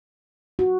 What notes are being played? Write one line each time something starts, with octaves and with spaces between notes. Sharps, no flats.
F#4